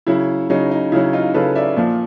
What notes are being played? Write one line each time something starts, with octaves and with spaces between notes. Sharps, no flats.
C#3 F#3 E4
C#3 F#3 D#4
D#4
C#3 F#3 E4
D#4 F4
C#3 F#3 A4 B4
D5 E5
A#2 F3